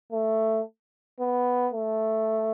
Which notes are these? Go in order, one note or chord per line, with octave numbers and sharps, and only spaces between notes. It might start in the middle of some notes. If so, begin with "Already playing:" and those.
A3
B3
A3